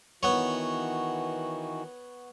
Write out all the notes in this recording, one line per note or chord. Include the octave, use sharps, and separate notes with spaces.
D#3 E3 B3 F#4 C#5